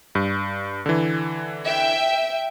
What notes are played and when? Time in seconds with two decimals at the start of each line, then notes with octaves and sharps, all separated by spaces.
0.15 G2
0.86 D3 E3
1.67 E5 G5